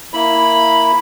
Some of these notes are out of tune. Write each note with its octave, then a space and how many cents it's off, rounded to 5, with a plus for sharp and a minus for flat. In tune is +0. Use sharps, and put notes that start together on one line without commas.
A#3 +0 E4 +5 B5 +0